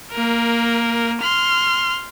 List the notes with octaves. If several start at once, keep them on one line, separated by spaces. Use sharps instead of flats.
A#3 A#4
C6 F6